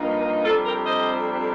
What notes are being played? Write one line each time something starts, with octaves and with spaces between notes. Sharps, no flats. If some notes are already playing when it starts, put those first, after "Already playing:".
Already playing: G2 F3 A#3 D#4
F2 C3 G3 D4 F4 A4
G4 A#4
C5 D#5